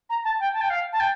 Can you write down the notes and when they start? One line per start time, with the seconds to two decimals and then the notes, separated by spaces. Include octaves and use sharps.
0.10 A#5
0.24 A5
0.40 G5
0.54 A5
0.61 G5
0.70 F5
0.93 A5
1.00 G5